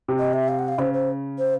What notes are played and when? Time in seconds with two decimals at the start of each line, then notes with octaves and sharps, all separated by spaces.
0.08 C3
0.19 D#5
0.33 E5
0.48 F5
0.59 F#5
0.68 F5
0.78 C#3 C5
0.93 C5
1.39 C5